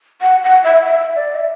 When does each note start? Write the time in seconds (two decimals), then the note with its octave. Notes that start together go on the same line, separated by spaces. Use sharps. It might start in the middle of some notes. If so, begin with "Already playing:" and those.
0.22 F#5
0.44 F#5
0.64 E5
0.85 E5
1.16 D5
1.36 E5